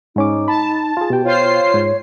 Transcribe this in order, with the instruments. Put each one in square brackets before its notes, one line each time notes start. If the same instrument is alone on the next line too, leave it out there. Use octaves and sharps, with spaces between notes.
[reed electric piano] G#2 C#4 D6 [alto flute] D#4
[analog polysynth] A5 [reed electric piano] B5
[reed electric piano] F4 G#4
[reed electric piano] B2 G5 [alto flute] G4
[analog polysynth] F4 C5 C7 [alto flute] C#5
[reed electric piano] G#2